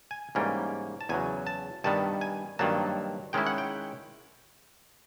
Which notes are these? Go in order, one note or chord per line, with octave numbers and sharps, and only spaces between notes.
G#5
G#2 E3 G3 A#3 C#4 G5
A5
E2 C#3 F#3 G#5
A5
G2 D#3 G3 B3 A5
G#5
G2 D#3 F#3 A#3 A5
D#3 G#3 C#4 E4 G5
F#5
G5